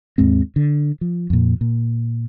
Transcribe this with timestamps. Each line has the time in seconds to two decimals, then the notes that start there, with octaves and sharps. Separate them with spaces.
0.18 D#2 G#2 G#3 C4
0.56 D3
1.01 F3
1.30 F2 A#2
1.61 A#2